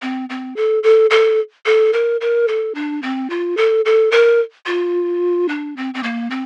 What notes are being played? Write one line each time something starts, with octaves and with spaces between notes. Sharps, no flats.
C4
C4
A4
A4
A4
A4
A#4
A#4
A4
D4
C4
F4
A4
A4
A#4
F4
D4
C4
C4
A#3
C4